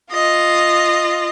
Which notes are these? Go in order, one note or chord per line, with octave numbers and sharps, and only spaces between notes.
F4 D#5